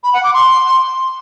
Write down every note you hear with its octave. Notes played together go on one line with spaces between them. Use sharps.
B5
F#5
D6
C6